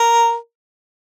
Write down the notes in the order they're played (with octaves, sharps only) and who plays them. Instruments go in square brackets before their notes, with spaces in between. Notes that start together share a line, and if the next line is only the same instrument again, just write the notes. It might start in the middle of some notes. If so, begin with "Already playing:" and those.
Already playing: [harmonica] A#4